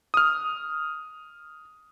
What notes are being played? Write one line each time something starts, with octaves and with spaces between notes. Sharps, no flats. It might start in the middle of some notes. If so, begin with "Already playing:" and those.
D#6 F6